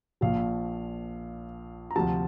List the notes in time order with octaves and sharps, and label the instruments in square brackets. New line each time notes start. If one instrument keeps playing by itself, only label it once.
[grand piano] A#1 A#2 F3 F5
A#5
D2 C3 F3 A5